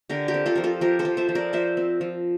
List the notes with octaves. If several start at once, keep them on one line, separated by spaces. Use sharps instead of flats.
D3 G4 A#4
G4 A#4
C4
F4 A4
F3 A#4
F4 A4
F3 G4 A#4
A4 C5
F3
C5 E5
F3
A#4 D5
F3 C5 E5
C4
F3